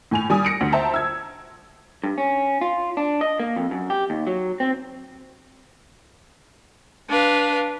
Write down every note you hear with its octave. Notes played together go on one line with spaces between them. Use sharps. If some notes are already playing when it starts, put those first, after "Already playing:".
A2 G#5 F7
G3 G#5 D#6
A#6 C#7 D7
D2
C5 E5 G5 A5 A#5
E6 G#6
G2
C#4
F4
D4
D#5
A#3
F2
F#2
G4
D#2
F#3
C4
D4 B4 F5